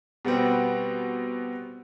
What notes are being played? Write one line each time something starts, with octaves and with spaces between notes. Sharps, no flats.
B2 G3 B3 C4